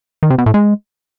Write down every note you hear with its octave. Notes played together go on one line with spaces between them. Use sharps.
D#3
C3
B2
A2
G#3